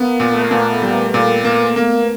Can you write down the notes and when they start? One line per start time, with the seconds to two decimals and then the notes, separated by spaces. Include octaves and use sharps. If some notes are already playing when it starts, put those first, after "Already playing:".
Already playing: A#3 B3
0.20 A#2
0.33 A3
0.42 A#3
0.51 A#2 B3
0.82 G3
1.14 A#2
1.45 A#3
1.76 A#3